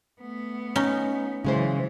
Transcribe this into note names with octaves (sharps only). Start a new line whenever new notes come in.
A3 B3
C#4 D#4
C#3 E3 F#3 G#3 C5